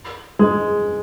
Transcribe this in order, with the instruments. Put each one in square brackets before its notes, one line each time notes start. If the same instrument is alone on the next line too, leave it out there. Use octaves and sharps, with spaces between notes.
[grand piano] G#3